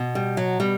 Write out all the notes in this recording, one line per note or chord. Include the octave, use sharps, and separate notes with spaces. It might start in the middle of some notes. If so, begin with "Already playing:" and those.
Already playing: B2
G3
F#3
B2 G3